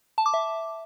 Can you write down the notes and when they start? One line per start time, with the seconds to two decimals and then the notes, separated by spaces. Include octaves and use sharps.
0.18 A5
0.26 D6
0.34 E5